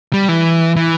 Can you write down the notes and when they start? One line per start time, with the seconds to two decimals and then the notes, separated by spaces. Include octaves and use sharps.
0.13 G3
0.29 E3
0.76 E3